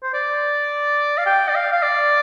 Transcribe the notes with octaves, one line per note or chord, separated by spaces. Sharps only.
C5
D5
F5
G5
D5
F5
F5
D5